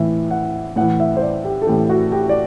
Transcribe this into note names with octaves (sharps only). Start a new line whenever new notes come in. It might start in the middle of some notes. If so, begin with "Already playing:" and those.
Already playing: A2 E3 E5
F#5
A2 E3 F#5
E5
C5
D5
G4
A4
A2 E3 G4
F#4
G4
D5